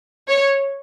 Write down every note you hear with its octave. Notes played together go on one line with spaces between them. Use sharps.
C#5